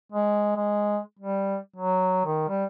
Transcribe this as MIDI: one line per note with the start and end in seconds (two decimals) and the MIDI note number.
0.12 0.52 56
0.56 0.99 56
1.19 1.57 55
1.76 2.23 54
2.26 2.47 51
2.48 2.65 55